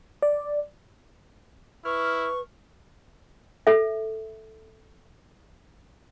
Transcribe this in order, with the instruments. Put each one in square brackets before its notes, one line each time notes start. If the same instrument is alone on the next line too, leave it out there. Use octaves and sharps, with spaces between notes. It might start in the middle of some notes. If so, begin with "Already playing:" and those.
[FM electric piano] D5
[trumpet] E4 [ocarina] B4 [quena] C#6 [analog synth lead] F6
[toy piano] A4 E5